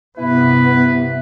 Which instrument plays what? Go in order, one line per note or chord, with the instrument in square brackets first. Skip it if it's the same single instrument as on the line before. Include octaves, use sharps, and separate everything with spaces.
[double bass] G2 C3 [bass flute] B3 [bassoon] E4 [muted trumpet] B4